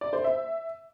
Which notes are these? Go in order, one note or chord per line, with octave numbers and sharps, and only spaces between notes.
D5
C5
E5